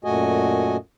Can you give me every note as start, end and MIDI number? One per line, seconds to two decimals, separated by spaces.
0.04 0.77 42
0.04 0.77 46
0.04 0.77 57
0.04 0.77 66
0.04 0.77 75
0.04 0.77 80